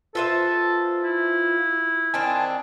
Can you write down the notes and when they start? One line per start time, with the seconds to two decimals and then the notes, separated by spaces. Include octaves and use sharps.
0.15 F4 A4 B4 C5 E5
1.04 E4
2.14 D#3 C4 D4 G#5 A5